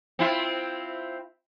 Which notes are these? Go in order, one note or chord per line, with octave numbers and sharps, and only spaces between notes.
C4 E4 F4